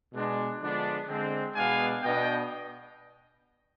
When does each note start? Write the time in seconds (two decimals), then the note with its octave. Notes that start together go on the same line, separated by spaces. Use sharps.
0.13 B2 G#3 D4
0.61 D3 F3 G#3 B3 D4
1.08 D3 G#3 C4
1.55 B2 G#3 B3 D4 F5 G#5
2.02 B2 B3 D4 D#5 G5